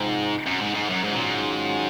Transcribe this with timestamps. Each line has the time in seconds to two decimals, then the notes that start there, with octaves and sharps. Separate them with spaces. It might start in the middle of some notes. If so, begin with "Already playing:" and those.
Already playing: G#2 C3 F3 C4 D#4
0.46 F#2
0.61 G#2
0.75 G#2
0.90 F#2
1.04 G#2 D#3 F#3 C#4 F4
1.14 A#2
1.23 G#2